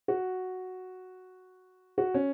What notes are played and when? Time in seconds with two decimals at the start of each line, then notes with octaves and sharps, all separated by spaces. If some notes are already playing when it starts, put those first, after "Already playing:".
0.08 F#4
1.98 F#4
2.14 C#4